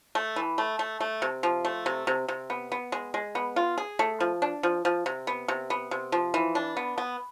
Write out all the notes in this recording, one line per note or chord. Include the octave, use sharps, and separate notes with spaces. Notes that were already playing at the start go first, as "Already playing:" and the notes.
A3
E3
A3
A3
A3
C3
F3
A3
C3
C3
C3
B3
B3
G#3
G#3
B3
F4
G#4
A3
F3
D4
F3
F3
C3
B3
C3
B3
C3
F3
E3
D4
B3
B3